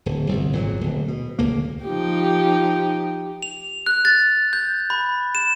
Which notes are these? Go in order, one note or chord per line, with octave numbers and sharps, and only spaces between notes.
D1
G1 C2
G#1 A#2 F#3
D1 B2
B2
D1 C#2 A#3
F3 D#4 G4
F7
F#6
A6
G6
B5
E7